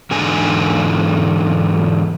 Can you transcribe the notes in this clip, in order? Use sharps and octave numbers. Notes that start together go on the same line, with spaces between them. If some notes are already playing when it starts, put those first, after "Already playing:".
E2 G#2 D3 D#4 G#5